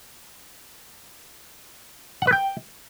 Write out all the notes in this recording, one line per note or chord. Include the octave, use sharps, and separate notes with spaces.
F#5
B4
G5